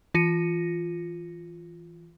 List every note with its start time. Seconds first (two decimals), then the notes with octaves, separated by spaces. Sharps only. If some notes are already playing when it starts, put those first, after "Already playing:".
0.14 E3 F4 A#6 C#7 D#7